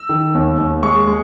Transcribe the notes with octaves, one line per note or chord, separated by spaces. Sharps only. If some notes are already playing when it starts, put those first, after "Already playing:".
Already playing: E6
D#3
D#2
D#2
G#3 C#6
G#3